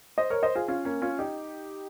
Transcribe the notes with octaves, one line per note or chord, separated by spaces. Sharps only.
C5 D#5
A#4 C#5
C5 D#5
F4 G#4
C#4 F4
A#3 C#4
C#4 F4
D#4 G4